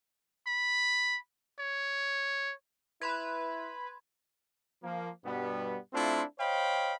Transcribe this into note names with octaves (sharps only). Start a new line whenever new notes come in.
B5
C#5
E4 B4 B5 C6 G#6
F3 A#3
G2 B2 G3 B3
A3 C4 D4 E4 F4
C5 C#5 D#5 F5 G5 B5